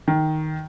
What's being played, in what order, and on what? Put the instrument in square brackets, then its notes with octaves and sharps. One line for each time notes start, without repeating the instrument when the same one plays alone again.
[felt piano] D#3